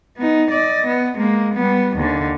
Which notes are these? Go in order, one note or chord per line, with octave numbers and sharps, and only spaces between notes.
B3 D#4
D5 D#5
B3
G#3 A#3
G3 B3
D#2 D3